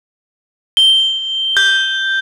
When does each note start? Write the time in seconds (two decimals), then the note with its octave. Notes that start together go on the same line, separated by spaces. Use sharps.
0.77 G7
1.57 G6